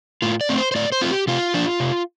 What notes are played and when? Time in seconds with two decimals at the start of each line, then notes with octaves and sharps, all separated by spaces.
0.22 A2 F4
0.41 D5
0.49 A3 C4
0.58 C5
0.72 C5
0.75 A2 D5
0.92 C5
1.01 A3 C4 F4
1.11 G4
1.27 C3 F4
1.54 F3 D4
1.80 C3